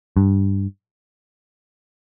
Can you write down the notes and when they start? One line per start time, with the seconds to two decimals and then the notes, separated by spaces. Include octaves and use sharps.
0.17 G2